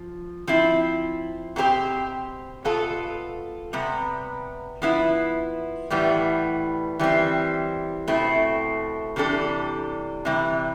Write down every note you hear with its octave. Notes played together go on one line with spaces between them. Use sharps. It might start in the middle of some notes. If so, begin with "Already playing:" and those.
Already playing: F3
F3 C4 E4
B2 A3 C4 G4 C5
B2 B3 F4 A4
C3 G3 B3
F3 B3 E4
A2 E3 G3 B3
E3 G3 C4
B2 A3 C4 E4
C3 E3 G3 D4 A4
C3 E3 G3